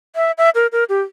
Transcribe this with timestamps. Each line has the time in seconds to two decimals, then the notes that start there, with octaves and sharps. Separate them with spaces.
0.16 E5
0.38 E5
0.55 A#4
0.72 A#4
0.89 G4